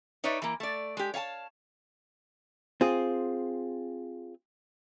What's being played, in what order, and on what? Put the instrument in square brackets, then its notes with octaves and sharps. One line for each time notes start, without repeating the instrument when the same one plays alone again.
[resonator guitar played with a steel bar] D#4 B4 C#5 D5 E5
E3 A#3
A3 D5
G#3 G4
C#5 F5 G#5 A5
[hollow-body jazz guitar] C4 F4 G#4